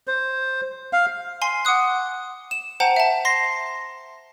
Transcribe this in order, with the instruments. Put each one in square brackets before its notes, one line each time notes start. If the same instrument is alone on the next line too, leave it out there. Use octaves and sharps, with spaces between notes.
[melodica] C5
F5
[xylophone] G#5 C6 C7
F#5 D6 D#6 F#6
E7
C5 F#5 G5 A5 A#5
E5 A5
C6 A#6 C7